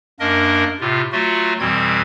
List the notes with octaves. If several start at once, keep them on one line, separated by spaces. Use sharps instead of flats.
F#2 A#3 D4 A#4 D#5
A2 C3 F4
F#3 A3 F4 F#4
F2 B2 E3 G3 C4 G#6